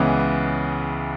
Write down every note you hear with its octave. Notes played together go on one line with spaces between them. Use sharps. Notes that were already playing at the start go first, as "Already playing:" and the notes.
Already playing: C#2 C#3 E3 G#3 B3